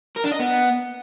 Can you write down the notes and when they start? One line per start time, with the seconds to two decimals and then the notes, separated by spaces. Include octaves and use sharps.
0.16 A#4
0.24 D4
0.32 D#5
0.39 B3